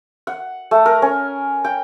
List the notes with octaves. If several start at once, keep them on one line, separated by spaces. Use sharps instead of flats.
F#5
A3
A#4
C#4
G5